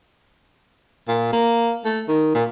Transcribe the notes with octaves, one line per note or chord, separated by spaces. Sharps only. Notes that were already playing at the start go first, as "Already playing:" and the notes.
A#2
A#3
A3
D#3
A#2